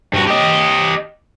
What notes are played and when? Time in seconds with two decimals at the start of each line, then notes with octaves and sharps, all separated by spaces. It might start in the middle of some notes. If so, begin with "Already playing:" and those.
0.14 G2 F#4
0.27 G4 D#5